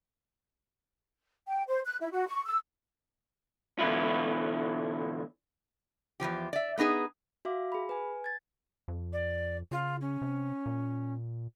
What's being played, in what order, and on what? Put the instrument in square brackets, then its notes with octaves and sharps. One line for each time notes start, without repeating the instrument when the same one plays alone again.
[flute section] G5
C5
F#6
E4
F#4
C#6
E6
[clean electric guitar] B2 D3 E3 F#3 E4 F4
[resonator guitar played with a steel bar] E2 G2 F3 G4
D5 E5
A3 B3 D#4 G#4 B4
[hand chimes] F#4 E5 F5 D6
G#4 B5
B4 G#5
G#6 A6
[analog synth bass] F2
[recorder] D5
[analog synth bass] C#3 [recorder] F4
[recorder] C#4
[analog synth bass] C3
A#2